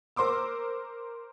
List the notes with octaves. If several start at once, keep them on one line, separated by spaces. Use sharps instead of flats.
A#4 C5 C6 D6 E6